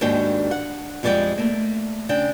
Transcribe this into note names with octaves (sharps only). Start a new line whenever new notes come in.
D#2 G#2 D#3 D4 F#4 G5
F#5
F2 G3 G#3 D5 F#5 G5
A3 A#3
C#3 D4 G5